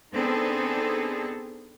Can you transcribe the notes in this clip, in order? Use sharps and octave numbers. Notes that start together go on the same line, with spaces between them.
B3 C4 D4 D#4 G#4 A4